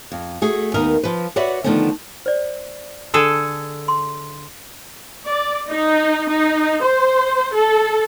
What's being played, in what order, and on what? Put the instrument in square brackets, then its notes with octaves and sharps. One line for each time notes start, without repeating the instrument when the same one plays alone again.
[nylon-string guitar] F2
A3 F#4 G#4
D#2 D#3 B3 A#4 D#5
F3 B4
F#4 B4 C#5 D5 E5 F#5
D3 D#3 F3 A3 B3 C#4
[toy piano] C5 D5
[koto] D3 G#4 A4 [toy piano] G#5 A5
[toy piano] C6
[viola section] D5
D#4
D#4
C5
A4